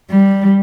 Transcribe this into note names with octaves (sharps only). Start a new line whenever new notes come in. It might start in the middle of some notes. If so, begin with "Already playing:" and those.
G3